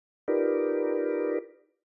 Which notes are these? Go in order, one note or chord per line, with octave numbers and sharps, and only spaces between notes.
D#4 F4 G4 A#4 B4 D5